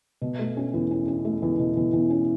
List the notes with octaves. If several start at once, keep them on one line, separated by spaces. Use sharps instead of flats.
B2
A3
C#4
E2
C#4
C#4
A3
E2
B2
E2
E2
C#4